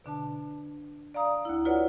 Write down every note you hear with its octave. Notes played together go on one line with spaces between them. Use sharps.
B2 D3 D4 A5
D5 F5 A#5 D#6
D2 E4
F4 F#4 B4 C#5 D5 F#5